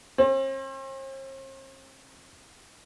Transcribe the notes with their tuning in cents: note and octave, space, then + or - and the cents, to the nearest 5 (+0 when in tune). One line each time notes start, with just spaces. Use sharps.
C4 +45